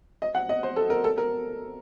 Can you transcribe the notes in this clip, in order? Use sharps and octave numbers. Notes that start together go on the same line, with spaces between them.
D#5
F#5
D#5
C5
A4
A#4
A4
A#4